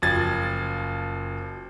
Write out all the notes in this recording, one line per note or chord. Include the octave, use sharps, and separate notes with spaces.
F#1 F3 G#6 A6